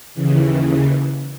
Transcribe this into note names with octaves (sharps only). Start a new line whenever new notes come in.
D#2 C#3 E3